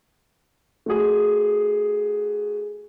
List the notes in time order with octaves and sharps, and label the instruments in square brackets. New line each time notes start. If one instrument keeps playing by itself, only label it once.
[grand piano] A3 F#4 G#4